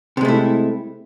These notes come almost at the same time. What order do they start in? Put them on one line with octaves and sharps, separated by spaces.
C3 G#3 A3 E4